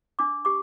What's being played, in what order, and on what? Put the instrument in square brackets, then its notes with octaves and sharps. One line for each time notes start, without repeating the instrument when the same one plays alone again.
[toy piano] D4 D6
G4 D6